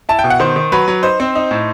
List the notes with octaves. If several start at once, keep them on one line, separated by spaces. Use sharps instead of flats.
E4 A5
G5
B2
F#5
D#3 C5
D#3
F#3 B4
F#3
D#4 C5
C4
D#4
A2